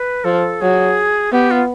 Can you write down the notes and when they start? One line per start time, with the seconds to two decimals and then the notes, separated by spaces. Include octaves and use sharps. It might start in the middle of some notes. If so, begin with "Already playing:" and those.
Already playing: B4
0.24 F3 A4
0.61 F#3 G#4
1.32 B3 G4
1.51 F4